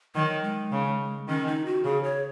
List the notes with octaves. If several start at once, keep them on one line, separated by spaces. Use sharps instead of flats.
D#3 F#3
G#3
C#3
D#3 C#4
D#4
F#4
C#3 G#4
C#5